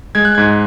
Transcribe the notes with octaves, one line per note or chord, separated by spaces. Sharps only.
G#3 G#6
F#6
G#2 G#6